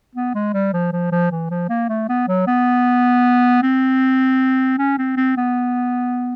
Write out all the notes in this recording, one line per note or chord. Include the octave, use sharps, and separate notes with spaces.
B3
G#3
G3
F3
F3
F3
E3
F3
A#3
A3
B3
F#3
B3
C4
C#4
C4
C4
B3